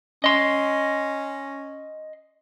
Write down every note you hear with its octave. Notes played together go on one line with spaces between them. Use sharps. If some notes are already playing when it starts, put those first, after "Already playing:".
C#4 D#5 C6